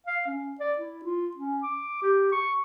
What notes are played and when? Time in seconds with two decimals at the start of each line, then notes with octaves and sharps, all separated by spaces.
0.07 F5
0.27 C#4
0.60 D5
0.78 E4
1.04 F4
1.37 C#4
1.63 D6
2.02 G4
2.32 C#6